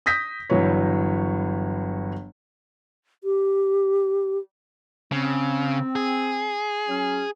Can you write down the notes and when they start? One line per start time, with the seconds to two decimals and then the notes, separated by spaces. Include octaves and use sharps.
0.06 D#6 G6 A#6 B6
0.50 G1 E3 F#3 B4 C#5
3.24 G4
5.12 C#3 C4
5.96 G#4
6.88 F#3 C#4